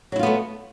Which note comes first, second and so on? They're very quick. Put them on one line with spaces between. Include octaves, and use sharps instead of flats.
F#3 E4 F4 B3 A3